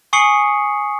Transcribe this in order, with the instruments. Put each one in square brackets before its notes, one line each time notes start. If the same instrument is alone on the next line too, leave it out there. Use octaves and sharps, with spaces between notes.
[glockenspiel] G#5 C#6 D#6 C7 C#7 F#7